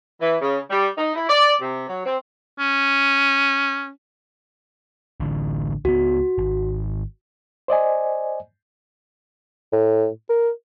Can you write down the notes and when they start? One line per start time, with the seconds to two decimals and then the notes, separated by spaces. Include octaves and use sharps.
0.21 E3
0.41 C#3
0.70 G3
0.98 D#4
1.15 E4
1.29 D5
1.61 C3
1.89 F#3
2.06 C4
2.59 C#4
5.20 A1 D3
5.85 C#2 F3 B3 F#4
6.38 G#1
7.68 C5 D5 D#5 G#5
9.73 A2
10.29 A#4